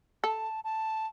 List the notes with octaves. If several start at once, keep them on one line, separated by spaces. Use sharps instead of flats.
A4 A5
A5